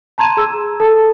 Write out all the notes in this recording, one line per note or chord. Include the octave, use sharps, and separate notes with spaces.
A5 A#5 C6 G#6 D#7 E7
G#4 E6
A4 A5